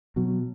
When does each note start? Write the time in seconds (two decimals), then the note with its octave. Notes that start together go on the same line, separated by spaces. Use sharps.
0.16 B2 F#3